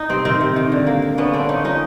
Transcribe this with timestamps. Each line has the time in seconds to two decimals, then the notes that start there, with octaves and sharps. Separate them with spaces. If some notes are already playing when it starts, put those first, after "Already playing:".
Already playing: D#4
0.09 C3 C4
0.25 D#3 C4
0.41 C3
0.56 D#3
0.72 D3
0.87 A#3
1.02 A#3
1.18 D3 B3 C#4
1.33 A#3 C4 D4
1.49 A#3 C#4 D#4
1.64 F3 C#4 D#4